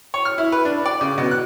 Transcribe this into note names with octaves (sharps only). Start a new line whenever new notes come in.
C#5
F6
E4
B4
D4
D5
C#3
B2
F#6